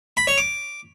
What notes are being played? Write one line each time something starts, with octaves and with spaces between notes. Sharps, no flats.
B5
C#5
D6